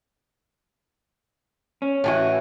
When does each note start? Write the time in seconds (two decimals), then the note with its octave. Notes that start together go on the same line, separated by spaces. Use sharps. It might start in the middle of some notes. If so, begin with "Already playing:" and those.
1.82 C#4
2.04 A2 E3 F#4